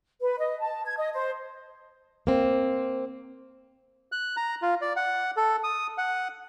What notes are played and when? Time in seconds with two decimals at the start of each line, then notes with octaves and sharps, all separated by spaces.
0.20 B4
0.38 D#5
0.61 A5
0.85 G#6
0.97 D#5
1.14 C5
2.27 A#3 C4
4.12 F#6
4.37 A#5
4.62 F4
4.82 D5
4.96 F#5
5.37 A4
5.64 D#6
5.98 F#5